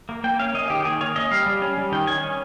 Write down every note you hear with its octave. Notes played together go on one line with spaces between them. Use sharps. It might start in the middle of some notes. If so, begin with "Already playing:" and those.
A#3
A#3 G5
C#4 F5
A#3 D#5
G#4
D#3 G4
G4
D#3 G#4
A#3 C#5
C#4 D#5
G3 F5
G3
C#4
G3
D#3 G5
C#4 G#5
C#4